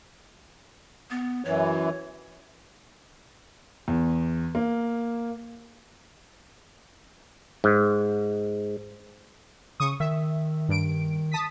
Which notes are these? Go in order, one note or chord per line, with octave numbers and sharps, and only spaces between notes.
B3
F#2 E3 C#5
E2
A#3
G#2
C#3 C#6 D#6
D#3 E5
G2 D7
A5 D#6 B6